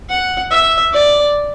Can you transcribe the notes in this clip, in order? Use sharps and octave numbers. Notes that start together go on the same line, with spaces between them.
F#5
E5
D5